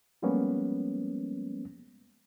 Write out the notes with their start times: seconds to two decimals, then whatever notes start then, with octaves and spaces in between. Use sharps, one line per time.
0.22 F3 G3 G#3 A#3 B3 C#4